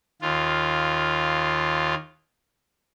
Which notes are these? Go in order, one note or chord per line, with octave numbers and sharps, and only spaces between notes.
D#2 F4